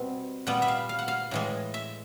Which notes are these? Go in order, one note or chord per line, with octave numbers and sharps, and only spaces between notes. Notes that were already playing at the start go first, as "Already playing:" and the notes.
Already playing: B2 G3 C4
A#2 G3 B3 F#5
E5
F5
F5
F#5
F5
A2 E3 G#3
E5